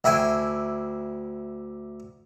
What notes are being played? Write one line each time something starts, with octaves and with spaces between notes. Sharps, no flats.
D2 E4 G5 G#5